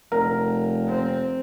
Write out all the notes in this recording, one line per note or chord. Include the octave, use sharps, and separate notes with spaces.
F1 A#4
C4